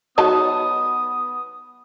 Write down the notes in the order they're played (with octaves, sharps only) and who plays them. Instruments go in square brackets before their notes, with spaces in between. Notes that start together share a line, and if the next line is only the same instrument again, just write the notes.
[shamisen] F#3 D#4 A5 [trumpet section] B3 D#6